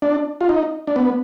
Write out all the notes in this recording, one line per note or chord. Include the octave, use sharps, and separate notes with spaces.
D4
F4
D#4
D4
B3